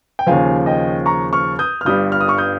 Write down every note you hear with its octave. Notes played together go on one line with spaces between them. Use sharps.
G5
D#2 C#3 F3 F5 G#5
D#5 G5
A#5 C#6
C#6 F6
D#6 G6
F6
G1 G2 G3 D#6 G6
F6
D#6
C#6 F6
D#6 G6